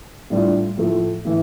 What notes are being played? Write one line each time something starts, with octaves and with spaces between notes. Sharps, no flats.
A2 G3 D4 F4
A2 F3 A3
A2 E3